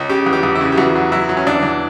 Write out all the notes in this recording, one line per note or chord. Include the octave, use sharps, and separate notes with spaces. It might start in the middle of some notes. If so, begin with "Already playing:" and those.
Already playing: C#2
C#3 G4
E2
G4
E2
E4
C#3
G4
E2 F#4
F#3
F#3 E4
F#3
C#4
E2 D4
E2